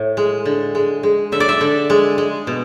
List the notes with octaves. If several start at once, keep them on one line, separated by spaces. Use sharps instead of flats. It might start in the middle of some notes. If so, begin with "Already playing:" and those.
Already playing: A2
G#3
D3
G#3
G#3
D3 E5
D5
E5
D3
G#3
G#3
B2